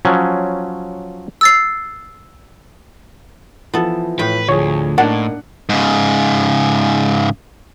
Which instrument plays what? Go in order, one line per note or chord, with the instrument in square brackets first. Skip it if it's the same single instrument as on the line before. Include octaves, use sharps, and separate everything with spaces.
[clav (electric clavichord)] F3 F#3 C#4
[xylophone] E6 A6 C7
[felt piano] E3 F3 [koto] B3 A4
[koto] A2 G5 [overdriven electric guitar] B4
[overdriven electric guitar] D2 [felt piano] F3 G#4 [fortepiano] C#5
[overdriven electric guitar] A2 [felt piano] A#3 D#4 [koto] D4 [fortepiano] F#5
[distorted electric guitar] G#2 C#3